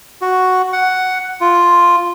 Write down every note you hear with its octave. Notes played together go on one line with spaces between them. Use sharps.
F#4
F#5
F4